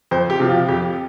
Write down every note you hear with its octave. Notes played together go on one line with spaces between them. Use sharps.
F2 C5
G4
C3 F3
F4
F2 G4